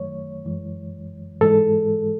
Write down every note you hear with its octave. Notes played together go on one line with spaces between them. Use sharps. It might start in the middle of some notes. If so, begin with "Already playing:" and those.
Already playing: F#2 D#3 F#3 A3 C#5
F#2 E3 G#3
G#2 E3 G#3 A4